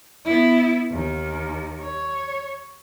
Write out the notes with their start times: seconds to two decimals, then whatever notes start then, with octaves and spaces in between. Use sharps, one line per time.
0.25 B3 E4
0.91 D#2
1.81 C#5